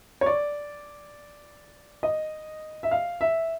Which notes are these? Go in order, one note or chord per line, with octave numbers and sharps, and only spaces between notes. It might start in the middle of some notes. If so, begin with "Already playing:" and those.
C#5
D5
D#5
E5
F5
E5